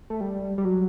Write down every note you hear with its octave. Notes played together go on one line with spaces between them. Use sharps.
A3
G3
G3
F#3